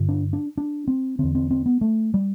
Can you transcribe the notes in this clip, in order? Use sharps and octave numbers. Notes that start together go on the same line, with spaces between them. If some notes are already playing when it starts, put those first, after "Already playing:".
Already playing: G2 D3
D4
D4
D4
C4
E2 D3 C4
C4
C4
B3
A3
G3